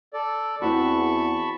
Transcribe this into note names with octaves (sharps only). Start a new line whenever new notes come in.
A4 D5
E2 C4 E4 F#4 A5 B5 C#6